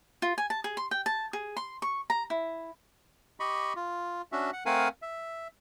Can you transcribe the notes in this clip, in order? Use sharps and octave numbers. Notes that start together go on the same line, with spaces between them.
F4
G#5
A5
G#4
C6
G5
A5
G#4
C6
C#6
A#5
E4
G4 D#5 B5 C#6
F4
C#4 D4 F#4 E5
F#5
A3 C4 A#4 F5 F#5 G#5
E5